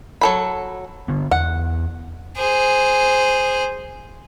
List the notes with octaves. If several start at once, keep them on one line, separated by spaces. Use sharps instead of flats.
F#3 A4 B5
D3 B3
E2 F#5
G#4 C5